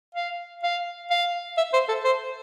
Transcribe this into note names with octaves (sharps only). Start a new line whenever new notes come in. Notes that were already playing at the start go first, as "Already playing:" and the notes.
F5
F5
F5
E5
C5
A4
C5